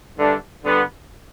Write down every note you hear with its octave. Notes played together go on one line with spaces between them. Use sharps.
G2 D3 A3 D4
G2 D3 B3